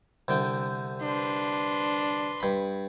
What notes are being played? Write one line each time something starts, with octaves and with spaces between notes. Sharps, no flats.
C2 D3 G5
D4 B4 C6
G2 B5